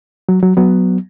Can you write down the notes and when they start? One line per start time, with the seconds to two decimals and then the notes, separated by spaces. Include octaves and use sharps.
0.29 F#3
0.43 F#3
0.57 F#3 B3